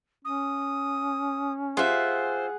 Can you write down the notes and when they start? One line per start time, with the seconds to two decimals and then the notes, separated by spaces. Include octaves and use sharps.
0.25 C#4 D#6
1.77 F4 G#4 C5 E5 F#5 G#5